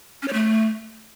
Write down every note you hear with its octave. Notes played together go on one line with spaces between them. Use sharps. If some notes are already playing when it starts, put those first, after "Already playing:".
C#4
C#5
A3